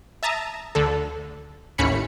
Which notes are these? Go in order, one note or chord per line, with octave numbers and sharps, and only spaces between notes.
E5 A5 A#5 D#6
D2 D3 A4
A1 D#2 A2 C#4 B5 C#7